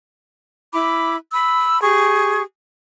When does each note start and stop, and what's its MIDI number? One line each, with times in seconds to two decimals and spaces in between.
0.72 1.16 64
0.72 1.16 83
0.72 1.16 86
1.32 1.80 83
1.32 1.80 88
1.82 2.41 67
1.82 2.41 68
1.82 2.41 85